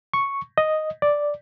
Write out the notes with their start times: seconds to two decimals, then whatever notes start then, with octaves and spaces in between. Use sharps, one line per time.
0.14 C#6
0.58 D#5
1.02 D5